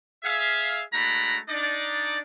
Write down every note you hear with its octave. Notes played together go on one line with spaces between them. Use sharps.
G#4 E5 F5
G#3 A3 D4 F#4 A#5 B5
D4 D#4 D5